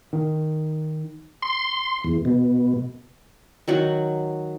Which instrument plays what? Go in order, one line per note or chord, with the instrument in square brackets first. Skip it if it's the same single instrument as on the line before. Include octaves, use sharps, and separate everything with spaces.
[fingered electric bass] D#3
[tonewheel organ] C6
E2
B2
[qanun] D#3 F#3 F#4